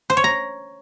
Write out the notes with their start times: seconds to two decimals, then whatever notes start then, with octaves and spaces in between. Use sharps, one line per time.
0.10 C5
0.17 C#5
0.24 A#5